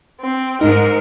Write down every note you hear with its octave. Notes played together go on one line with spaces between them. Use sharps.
C4
G#2 D#4 A#4